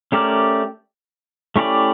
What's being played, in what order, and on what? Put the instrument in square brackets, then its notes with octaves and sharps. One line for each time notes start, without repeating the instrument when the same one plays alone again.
[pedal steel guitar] A3 C#4 G4 A#4 D5
A3 C#4 E4 G4 D5